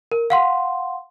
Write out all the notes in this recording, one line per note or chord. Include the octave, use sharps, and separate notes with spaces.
A#4
F5 F#5 C6